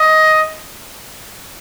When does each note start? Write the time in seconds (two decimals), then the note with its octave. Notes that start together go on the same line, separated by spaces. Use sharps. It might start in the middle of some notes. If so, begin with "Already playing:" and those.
Already playing: D#5